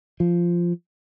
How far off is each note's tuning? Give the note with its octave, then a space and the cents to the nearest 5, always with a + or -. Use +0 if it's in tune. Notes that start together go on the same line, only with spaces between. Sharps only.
F3 -10